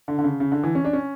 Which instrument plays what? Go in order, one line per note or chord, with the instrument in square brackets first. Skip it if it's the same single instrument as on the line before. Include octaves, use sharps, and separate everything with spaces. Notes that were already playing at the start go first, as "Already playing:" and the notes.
[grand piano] D3
D3
C#3
C#3
D3
E3
C#4
D4
C#4